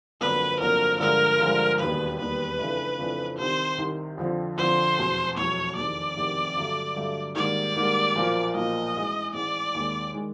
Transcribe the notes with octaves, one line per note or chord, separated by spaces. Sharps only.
G1 F2 D3 F#3 A#3 B4
G1 F2 D3 F#3 A#3 A#4
G2 D3 F3 G#3 A#4
G2 D3 F3 G#3
E1 D#2 D#3 G3 B3 B4
E1 D#2 D#3 G3 B3 B4
F2 C#3 E3 A3 D4
F2 C#3 E3 A3 D4
C2 C3 D#3 C5
C2 C3 D#3
F2 D3 F3
F2 D3 F3 C5
F1 E2 B2 F#3
F1 E2 B2 F#3 C#5
F1 E2 C3 D#3 D5
F1 E2 C3 D#3
G2 D3 F#3 A3
G2 D3 F#3 A3
G#2 D#3 G3 A#3 D5
G#2 D#3 G3 A#3
B1 A#2 F3 A#3
B1 A#2 F3 A#3 D#5
A1 G#2 E3 G#3
A1 G#2 E3 G#3 D5
D#2 D#3 G#3
D#3 G#3